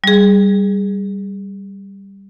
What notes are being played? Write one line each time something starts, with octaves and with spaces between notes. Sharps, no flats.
G3 G#4